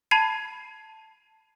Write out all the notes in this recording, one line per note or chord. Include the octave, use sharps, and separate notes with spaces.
A5 B5 G#6 C7 D#7